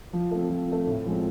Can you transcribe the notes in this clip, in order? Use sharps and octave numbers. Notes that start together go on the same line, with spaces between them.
F3
A3 C4
F3
A3 C4
A2
F3 G#3 C4